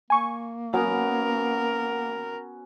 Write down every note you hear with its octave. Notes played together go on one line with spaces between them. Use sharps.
A#3 G#5 C#6
F#3 B3 C#4 F#4 A#4